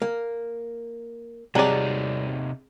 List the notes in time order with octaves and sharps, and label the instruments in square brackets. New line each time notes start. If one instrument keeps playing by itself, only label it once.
[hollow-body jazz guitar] A#3
[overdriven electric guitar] C3 D#4 [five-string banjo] F#3 D5 [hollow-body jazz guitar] G3 [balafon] C4 G#4 A#5